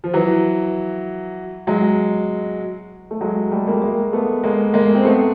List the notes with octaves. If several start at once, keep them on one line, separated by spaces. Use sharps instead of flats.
F3
E3 F#3
F#3 G#3
A3
F#3 G#3
G3 A3
G#3 A#3
A3
G#3 A#3
A3 B3
G#3 A#3
G#3 A#3
C4
A3 B3